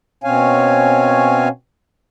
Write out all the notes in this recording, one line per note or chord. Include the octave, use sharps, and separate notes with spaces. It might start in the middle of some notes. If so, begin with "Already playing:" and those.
B2 C4 C#4 C#5 F5 G#5